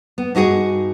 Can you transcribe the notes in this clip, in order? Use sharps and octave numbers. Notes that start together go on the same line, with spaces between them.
B3
G2 D#4 F#4 G#4